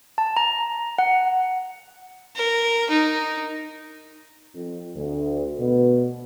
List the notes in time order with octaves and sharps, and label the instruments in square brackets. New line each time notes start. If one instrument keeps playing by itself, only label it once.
[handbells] A5
A#5
F#5
[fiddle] A#4
D#4
[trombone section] F2
D2
B2